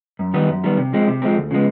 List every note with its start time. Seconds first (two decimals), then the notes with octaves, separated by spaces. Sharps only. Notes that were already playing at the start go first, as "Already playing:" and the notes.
0.19 F#2
0.34 D#3 G3 B3
0.49 F#2
0.64 D#3 G3 B3
0.77 C3
0.93 F3 G#3 C4
1.08 C3
1.22 F3 G#3 C4
1.36 D2
1.51 C#3 F3 G#3 B3